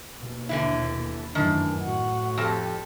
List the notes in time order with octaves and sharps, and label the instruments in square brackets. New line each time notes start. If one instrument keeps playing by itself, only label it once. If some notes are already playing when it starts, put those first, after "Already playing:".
[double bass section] D#2 B2
[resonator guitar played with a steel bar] D3 E3 E4
[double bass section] F#2 A2 E3 [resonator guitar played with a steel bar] D#3 [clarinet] D4
[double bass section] A2 [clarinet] F#4 [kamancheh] F#5
[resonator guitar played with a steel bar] F2 A5 [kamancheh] G4 A4